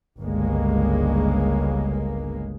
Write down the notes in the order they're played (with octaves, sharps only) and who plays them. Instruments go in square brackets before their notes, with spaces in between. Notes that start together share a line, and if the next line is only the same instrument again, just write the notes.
[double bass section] G1 C#2 G#3 A#3